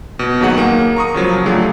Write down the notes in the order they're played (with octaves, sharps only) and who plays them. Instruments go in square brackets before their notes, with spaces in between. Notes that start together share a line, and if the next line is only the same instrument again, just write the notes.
[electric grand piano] B2
D#2 D#3 F#3 G#4 F#5
A#3
A#5 C#6 D#6
C#3 F3 F#3
D3 F#3 A3 F4 G4 G#4